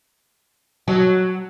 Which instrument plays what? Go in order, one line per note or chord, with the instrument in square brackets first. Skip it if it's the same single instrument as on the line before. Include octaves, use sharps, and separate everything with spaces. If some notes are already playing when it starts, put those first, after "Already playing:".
[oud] F#3